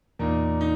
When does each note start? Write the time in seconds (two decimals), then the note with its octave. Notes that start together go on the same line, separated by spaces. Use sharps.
0.19 E2 A#2 E3 A#3 D#4
0.61 D#4